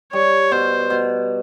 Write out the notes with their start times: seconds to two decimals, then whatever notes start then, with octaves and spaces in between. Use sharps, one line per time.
0.13 G3 C#5
0.51 B2 C5
0.90 B2